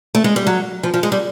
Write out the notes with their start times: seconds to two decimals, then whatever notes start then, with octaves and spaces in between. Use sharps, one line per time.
0.15 A3
0.24 G#3
0.36 G3
0.47 F#3
0.83 F3
0.94 F3
1.03 G#3
1.12 G3